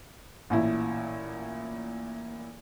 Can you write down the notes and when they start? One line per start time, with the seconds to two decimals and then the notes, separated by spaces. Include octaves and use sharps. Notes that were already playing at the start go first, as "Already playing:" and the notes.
0.50 A1 A#2 E4